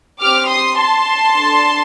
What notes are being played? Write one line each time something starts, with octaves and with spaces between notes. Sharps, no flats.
C4 G4 D6 F6
C6 D#6
A5 C6
D4 A4